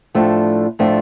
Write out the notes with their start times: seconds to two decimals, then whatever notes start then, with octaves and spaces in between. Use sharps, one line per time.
0.15 A2 F3 A3 D4 F4
0.79 A2 F3 A3 D4 F4